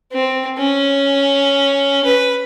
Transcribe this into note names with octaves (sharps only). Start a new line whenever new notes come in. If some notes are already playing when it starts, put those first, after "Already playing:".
C4
C#4
B4